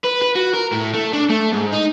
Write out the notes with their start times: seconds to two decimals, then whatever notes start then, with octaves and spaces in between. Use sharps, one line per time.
0.05 B4
0.22 B4
0.36 F#4
0.54 A#4
0.73 A2
0.94 A3
1.13 D4
1.30 A3
1.53 G#2
1.73 D#4